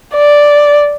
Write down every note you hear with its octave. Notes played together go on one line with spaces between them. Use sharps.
D5